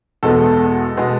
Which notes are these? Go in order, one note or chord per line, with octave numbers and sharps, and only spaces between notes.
E2 B2 G#3 B3 A4
B2 G#3 B3